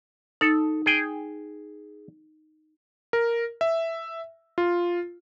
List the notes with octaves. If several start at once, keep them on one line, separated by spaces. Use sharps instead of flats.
D#4 A4
G#4 G5
A#4
E5
F4